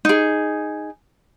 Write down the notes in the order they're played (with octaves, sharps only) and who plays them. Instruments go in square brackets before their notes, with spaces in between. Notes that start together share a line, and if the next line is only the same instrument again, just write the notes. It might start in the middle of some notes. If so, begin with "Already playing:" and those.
[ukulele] D#4 G#4